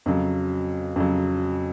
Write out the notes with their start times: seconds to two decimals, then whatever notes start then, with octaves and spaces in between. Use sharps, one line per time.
0.06 F2 C#3 F#3
0.96 F2 C#3 F#3